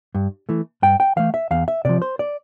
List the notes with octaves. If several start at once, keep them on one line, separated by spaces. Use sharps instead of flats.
G2
E3 A3
G2 G5
G5
E3 A3 F5
E5
E2 F5
E5
C3 F3 D5
C5
D5